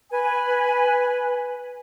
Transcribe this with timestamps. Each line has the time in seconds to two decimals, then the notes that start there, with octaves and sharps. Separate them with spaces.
0.11 B4 G#5